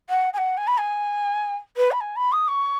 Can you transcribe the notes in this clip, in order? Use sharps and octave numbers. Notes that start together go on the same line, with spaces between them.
F#5
G#5
F#5
G#5
B5
G#5
B4
B5
G#5
B5
D#6
C#6